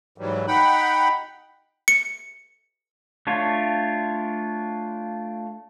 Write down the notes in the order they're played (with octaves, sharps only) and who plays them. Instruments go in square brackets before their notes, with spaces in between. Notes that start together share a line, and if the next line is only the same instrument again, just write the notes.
[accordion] G#2 E3 F#3 G3
D#4 F#5 G5 B5
[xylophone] C#7
[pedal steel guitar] A3 D4 F4 C#5